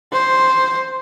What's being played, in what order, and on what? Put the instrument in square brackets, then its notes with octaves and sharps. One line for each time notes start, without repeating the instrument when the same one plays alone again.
[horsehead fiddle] C5